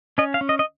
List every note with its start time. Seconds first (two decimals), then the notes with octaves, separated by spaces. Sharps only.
0.18 C#4 D#5
0.34 F5
0.41 C#4
0.49 D#5
0.59 D#5